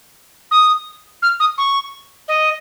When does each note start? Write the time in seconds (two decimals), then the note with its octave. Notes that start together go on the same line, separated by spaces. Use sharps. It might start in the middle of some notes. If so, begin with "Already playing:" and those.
0.51 D#6
1.22 F6
1.40 D#6
1.58 C#6
2.28 D#5